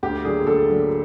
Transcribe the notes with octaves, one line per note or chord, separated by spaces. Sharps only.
D2 G4
D3 F#3 A#3 G#4
D2 A4
D3 F#3 A#3